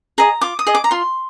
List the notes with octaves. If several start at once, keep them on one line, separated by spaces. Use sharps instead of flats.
G#4 D#5 A#5
F4 D6
D#6
G#4 D#5
D6
A#5
F4 C6